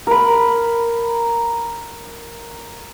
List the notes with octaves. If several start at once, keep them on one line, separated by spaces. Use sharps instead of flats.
A#4 B5